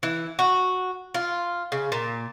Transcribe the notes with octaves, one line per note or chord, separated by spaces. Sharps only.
E3
F#4
F4
C#3
A#2